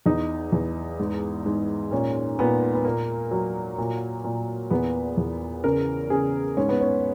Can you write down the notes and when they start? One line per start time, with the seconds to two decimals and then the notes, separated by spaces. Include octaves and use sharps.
0.06 E2 D#4
0.52 E2
0.99 G#2
1.46 G#2
1.91 A#2 C#4
2.39 A#2 B3
2.75 B3
2.85 A#2 A#3
3.31 F#3
3.78 A#2
4.24 A#2
4.70 E2 B3
5.17 E2
5.64 C#3 A#4
6.10 C#3 G#4
6.57 G#2 C#4
6.69 B3
6.81 C#4